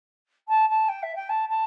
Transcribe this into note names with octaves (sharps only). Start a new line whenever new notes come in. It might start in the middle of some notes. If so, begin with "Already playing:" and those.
A5
A5
G5
E5
G5
A5
A5